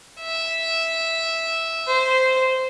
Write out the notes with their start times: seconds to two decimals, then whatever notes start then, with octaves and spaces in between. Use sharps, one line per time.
0.21 E5
1.87 C5